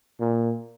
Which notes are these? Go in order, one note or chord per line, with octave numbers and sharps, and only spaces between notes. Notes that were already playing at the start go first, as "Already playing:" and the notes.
A#2